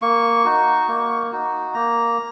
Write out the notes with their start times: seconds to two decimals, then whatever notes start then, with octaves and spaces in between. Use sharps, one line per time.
0.02 A#3 C#6
0.45 D#4 F#4
0.88 A#3
1.32 D#4 F#4
1.74 A#3 A#5